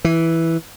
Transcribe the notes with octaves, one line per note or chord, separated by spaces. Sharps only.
E3